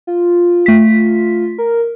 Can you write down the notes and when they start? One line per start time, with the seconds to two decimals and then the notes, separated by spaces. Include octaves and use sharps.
0.07 F4
0.66 A3 B6
1.58 A#4